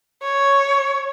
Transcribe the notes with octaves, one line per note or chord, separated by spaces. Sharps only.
C#5